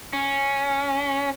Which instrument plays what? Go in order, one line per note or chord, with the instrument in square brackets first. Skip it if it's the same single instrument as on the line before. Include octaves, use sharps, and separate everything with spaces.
[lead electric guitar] C#4